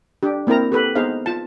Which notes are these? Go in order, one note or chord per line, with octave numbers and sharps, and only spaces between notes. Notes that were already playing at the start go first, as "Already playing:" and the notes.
D4 G4
A#3 C4 E4 A#4 A#5
G4 A4 B4
B3 D#4 G#4 C5 F5
F4 A5